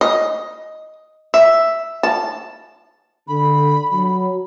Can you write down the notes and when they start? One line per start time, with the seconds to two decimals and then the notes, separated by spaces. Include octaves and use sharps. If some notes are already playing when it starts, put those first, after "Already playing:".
0.01 D#5
1.34 E5
2.03 A5
3.28 D3 B5
3.93 F#3